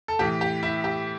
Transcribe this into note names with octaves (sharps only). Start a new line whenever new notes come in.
A4
A2 E3 G4
G4
E4
G4